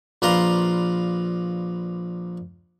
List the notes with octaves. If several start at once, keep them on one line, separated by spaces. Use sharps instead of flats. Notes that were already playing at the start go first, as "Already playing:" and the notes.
A#1 B4 D5 F5 A#5 C6